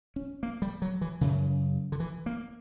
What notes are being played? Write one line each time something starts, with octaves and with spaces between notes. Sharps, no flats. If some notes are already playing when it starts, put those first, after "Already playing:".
C#4
A#3
G3
F#3
E3
F#2 C#3 E3
D3
E3
A#3